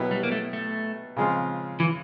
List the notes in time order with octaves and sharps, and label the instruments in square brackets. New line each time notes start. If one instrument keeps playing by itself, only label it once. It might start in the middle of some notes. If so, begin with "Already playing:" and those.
Already playing: [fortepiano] B2 F#3 B3 E4 G4
[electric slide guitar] G3
A#3
A3
A3
[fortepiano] C#3 F3 G#3 C4 F4
[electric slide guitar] E3